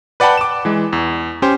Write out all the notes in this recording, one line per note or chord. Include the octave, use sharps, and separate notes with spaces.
B4 D5 F#5 G5 A5 B5
D6 E7
E3 G#3
E2
C#4 G4 C5